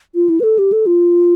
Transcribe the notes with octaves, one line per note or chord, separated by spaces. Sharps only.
F4
E4
B4
A4
G4
A4
F4